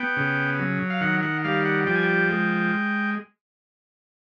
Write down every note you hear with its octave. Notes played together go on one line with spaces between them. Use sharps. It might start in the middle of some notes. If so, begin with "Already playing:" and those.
Already playing: B3 G5
C#3
F#3
F5
D#3 F#5
F#5
G3 F5
F#5
F3 G5
G#5
G5
G#3